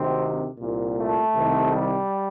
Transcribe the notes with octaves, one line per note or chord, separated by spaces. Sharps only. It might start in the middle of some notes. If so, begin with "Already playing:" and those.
Already playing: D2 C3 D#3 C4
C2 A#2
A3
C2 C3 D#3
G3